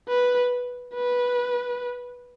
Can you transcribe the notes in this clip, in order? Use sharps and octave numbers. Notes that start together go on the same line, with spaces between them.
B4
B4